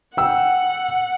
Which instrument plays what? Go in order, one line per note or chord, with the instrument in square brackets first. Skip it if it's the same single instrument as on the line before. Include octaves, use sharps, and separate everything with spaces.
[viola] F#5 [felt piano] G5 E6